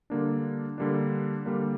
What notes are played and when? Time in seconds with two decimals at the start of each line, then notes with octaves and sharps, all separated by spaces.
0.10 D3 G3 A#3 D4
0.78 D3 G3 A#3 D4
1.45 D3 G3 A#3 D4